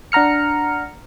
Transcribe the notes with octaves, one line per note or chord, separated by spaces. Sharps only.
D4 F#5 A#5 F6 C#7